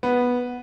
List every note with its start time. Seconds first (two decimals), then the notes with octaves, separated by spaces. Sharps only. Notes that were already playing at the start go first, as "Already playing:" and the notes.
0.03 B3